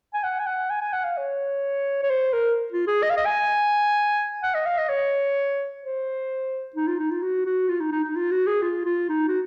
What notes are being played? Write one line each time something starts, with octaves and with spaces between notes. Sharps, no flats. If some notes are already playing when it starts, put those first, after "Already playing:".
G#5
F#5
G#5
F#5
G#5
G#5
F#5
F5
C#5
C#5
C5
A#4
F4
G#4
D#5
F5
D#5
G#5
F#5
D#5
F5
D#5
C#5
C5
D#4
F4
D#4
F4
F#4
F#4
F4
D#4
D#4
D#4
F4
F#4
G#4
F4
F4
D#4
F#4